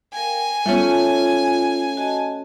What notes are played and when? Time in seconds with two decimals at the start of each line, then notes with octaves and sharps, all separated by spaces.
0.13 A#4 F5 G5 G#5
0.66 G3 A3 B3 C#4 F4
1.97 F#4 D#5 A5